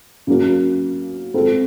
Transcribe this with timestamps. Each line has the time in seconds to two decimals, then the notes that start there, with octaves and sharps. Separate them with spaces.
0.27 C#3 F#3 A#3 C#4
1.34 G#3 C4 F4 A4